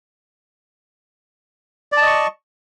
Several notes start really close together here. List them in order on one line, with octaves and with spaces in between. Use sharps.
D5 A5 D#5 C#6